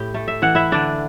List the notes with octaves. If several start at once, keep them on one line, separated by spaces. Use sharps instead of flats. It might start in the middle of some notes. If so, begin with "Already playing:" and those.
Already playing: A2 E4 G4 G5
A3
E5
E3 F#5
E4 E5
D3 D4 D5